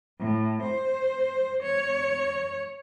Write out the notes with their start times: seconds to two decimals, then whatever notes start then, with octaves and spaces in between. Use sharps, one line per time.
0.20 A2
0.62 C5
1.63 C#5